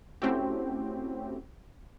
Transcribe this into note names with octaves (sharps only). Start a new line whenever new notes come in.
A3 C4 C#4 E4 F#4 G4